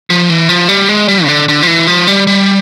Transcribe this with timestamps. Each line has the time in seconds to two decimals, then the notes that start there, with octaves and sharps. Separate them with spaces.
0.10 F3
0.30 E3
0.49 F3
0.69 G3
0.89 G#3
1.08 G3
1.25 C#3
1.28 D3
1.49 D3
1.62 F3
1.67 E3
1.87 F3
2.07 G3
2.27 G3